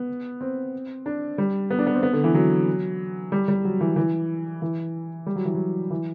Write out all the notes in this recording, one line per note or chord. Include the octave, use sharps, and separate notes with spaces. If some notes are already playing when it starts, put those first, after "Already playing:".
Already playing: B3
C4
D4
G3
B3
D4
B3
C4
B3
D3
E3
F#3
G3
G3
F#3
E3
E3
E3
G3
F#3
E3
F#3
E3